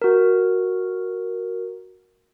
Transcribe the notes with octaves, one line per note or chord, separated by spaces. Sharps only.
F#4 A#4